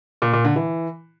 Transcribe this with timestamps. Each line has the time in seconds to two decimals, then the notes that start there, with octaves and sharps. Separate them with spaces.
0.22 A#2
0.33 A#2
0.45 D3
0.56 E3